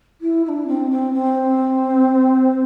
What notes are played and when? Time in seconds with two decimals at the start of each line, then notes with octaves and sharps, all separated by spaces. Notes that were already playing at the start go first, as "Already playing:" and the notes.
0.21 E4
0.44 E4
0.48 D4
0.67 C4
0.90 C4
1.13 C4